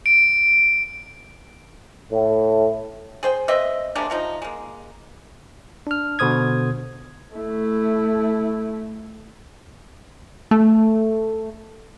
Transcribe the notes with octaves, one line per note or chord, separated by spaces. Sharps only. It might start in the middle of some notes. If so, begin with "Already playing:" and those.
D7
A2
G#4 C5 G5
C4 B4 D#5 E5
C3 G#3 A#3 D4
C3 F3 D#4
G#3 A#3
D4 F6
B2 D3 C5 D#6 G#6
A3 E4
A3